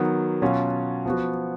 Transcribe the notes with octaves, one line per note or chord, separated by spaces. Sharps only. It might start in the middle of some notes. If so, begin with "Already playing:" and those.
Already playing: D#3 F#3 B3
B2 F#3 C#4 F4
F3 B3 F#4